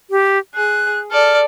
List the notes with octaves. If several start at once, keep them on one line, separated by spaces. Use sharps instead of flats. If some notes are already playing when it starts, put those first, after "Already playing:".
G4
G#4 F#6
A4 D5 F6